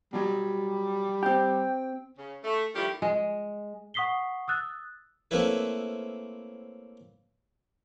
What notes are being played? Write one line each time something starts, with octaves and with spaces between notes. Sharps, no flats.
B2 F#3 G3
C4 G4 G5
C#3
A3
D#3 F3 G3 A3 E4 G4
G#3
F#5 C#6 D#6 B6 C7 G7
D#6 E6 F#6 A6
A3 A#3 C4 C#4 E4 B4